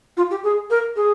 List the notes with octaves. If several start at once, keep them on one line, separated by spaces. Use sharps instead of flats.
F4
G4
G#4
A#4
G#4